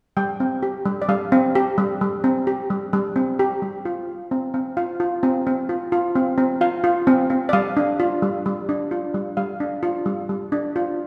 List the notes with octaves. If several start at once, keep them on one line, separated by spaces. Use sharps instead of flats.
G3 G5
C4
G4
G3
D5
G3 F5
C4
G4
G3
G3
C4
G4
G3
G3
C4
G4
G3
F4
F4
C4
C4
F4 F5
F4
C4
C4
F4
F4
C4
C4
F4 F5
F4
C4
C4
D5
G3 F5
D4
F4
G3
G3
D4
F4
G3
G3 F5
D4
F4
G3
G3
D4
F4